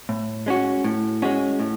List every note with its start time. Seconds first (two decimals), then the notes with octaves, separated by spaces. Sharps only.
0.09 A2
0.46 G#3 C#4 F#4
0.84 A2
1.22 G#3 C#4 F#4
1.60 A2